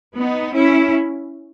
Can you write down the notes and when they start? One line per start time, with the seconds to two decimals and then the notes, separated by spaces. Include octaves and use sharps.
0.18 B3 D#4
0.54 C#4 E4